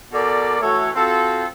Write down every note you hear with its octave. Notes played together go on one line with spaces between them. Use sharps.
B2 A4 A#4 D5
E3 A3 F#4 A4 C#5
C4 F4 F#4 A4